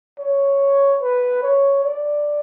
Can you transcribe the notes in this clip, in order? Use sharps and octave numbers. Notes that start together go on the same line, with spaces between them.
C#5
B4
C#5
D5